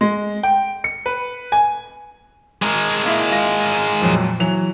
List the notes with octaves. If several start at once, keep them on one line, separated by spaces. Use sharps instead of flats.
G#3
G5
C#7
B4
G#5
G#3 A#4
A#3 E4
F4 A#6
F2 A#2 F#3
E3 F#3 F7